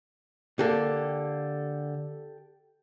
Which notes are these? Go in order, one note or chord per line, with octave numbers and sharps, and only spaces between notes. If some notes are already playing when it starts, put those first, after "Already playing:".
D3 A#3 G4 A4